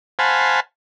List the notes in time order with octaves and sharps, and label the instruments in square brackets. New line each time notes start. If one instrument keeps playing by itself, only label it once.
[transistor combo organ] C5 F5 F#5 G#5 A5 B5